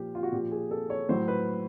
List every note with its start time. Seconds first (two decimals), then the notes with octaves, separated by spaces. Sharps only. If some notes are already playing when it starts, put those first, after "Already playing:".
Already playing: A#2 F3 G4
0.15 F4
0.23 F#4
0.32 A#2 F3 G4
0.51 G#4
0.71 A4
0.90 C#5
1.09 A2 F#3 C5
1.28 B4